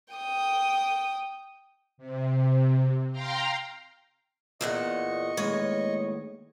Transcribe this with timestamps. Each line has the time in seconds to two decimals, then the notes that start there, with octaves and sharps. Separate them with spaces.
0.14 G5 D#6
1.98 C3
3.12 F5 G5 A#5 C6
4.61 E2 A#2 D#5 F#5 C#6
5.37 D#2 A2 G#3 C#5